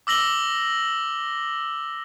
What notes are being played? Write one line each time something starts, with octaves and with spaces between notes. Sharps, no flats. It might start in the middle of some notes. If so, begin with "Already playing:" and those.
D6 E6 A#6 F#7 G7